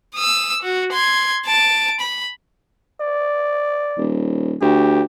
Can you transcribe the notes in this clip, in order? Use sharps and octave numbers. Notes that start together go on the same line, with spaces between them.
D#6 E6
F#4
C6 G#6
A5 D7
B5
D5
D#1
D2 G4